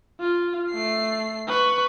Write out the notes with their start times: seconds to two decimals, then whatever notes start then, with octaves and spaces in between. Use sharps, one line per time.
0.20 F4
0.70 A3 C7
1.48 B4 C#6